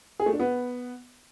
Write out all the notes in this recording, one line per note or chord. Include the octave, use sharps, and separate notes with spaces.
G#4
A3
D4
B3